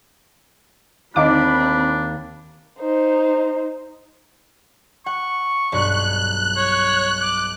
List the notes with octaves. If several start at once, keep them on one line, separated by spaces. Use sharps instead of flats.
D#2 C4 D4 D#4 F5 B5 D6
D#4 C5
F#5 C#6
B1 G2 F#6
C#5
D6